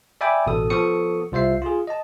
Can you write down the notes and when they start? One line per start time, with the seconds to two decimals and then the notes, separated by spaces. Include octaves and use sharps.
0.21 D5 E5 G5 G#5 B5 D6
0.46 A1 B2 A4 D#6
0.70 F3 B3 A4 C#6 D#6 C#7
1.32 C2 F4 C5 E5 C7
1.62 F4 G#4
1.87 D#5 A5